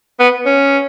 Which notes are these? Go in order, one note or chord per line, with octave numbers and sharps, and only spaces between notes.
B3
C#4